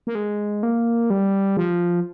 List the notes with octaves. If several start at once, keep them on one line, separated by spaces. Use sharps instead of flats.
A#3
G#3
A#3
G3
F3